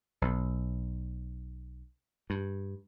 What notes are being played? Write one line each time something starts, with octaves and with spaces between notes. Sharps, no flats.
B1
G2